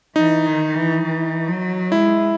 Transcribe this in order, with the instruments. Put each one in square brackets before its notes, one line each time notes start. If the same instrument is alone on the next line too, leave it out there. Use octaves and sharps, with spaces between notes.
[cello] E3 [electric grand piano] D#4
[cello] D#3
E3
E3
F#3
[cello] G#3 [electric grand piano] E4